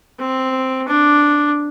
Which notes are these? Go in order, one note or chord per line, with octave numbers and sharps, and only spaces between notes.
C4
D4